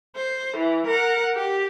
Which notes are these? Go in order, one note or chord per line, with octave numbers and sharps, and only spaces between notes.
C5
E3
A#4 F#5
G4